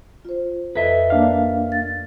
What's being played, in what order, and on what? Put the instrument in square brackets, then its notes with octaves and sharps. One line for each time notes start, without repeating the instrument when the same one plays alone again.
[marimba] F4 C5
[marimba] F2 A4 [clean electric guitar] B4 D#5 E5
[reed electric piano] A#3 D4 F5
[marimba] A6